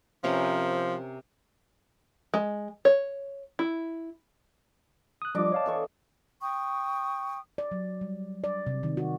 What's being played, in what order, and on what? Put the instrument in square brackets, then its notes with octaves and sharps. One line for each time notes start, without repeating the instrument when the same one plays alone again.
[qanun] C3 C#4 A#4 [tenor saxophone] F3
[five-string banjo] G#3
C#5
E4
[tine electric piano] D#6 F#6
[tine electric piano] F3 G3 F4 [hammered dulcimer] D4 D#5 D6
[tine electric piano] C#5 F5 A5
[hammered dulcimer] E3 A4 C#6
[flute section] G5 C#6 D#6
[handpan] D5
F#3
G3
D5
C3
D#3
F#4